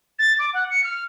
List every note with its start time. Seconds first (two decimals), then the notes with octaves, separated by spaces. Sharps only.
0.19 A6
0.39 D6
0.53 F#5
0.70 C#7
0.84 F6